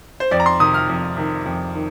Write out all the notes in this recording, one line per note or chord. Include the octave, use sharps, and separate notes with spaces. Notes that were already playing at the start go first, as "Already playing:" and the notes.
C5
F2 D5
A#5
C6
C3 D#3 D#6
F6
F2
C3 D#3
F2
D#3